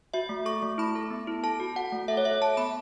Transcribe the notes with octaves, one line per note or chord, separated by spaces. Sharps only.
F#4 E5
A3
A4 C#6
A3
E4 B5
A4
B3
E4
A4 A5
F#4
F#4 F#5
A3
A4 E5
C#5
A4 E5
A4 A5
B3 B5